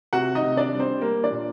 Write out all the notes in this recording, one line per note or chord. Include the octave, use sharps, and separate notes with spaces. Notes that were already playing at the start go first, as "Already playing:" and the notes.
C3 F#4 F#5
D#4 D#5
C3
D4 D5
G3
C4 C5
G3 A#3 A#4
D4 D5
A#2